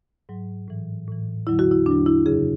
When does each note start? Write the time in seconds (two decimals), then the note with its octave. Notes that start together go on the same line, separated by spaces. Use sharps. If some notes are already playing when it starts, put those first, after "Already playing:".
0.29 G#2 F#3
0.68 A2 E3
1.08 A2 E3
1.47 E2 D3 F#3 E4
1.59 F#4
1.71 E4
1.86 E2 D3 F#3 D4
2.06 E4
2.26 F#2 C#3 F#3 G#4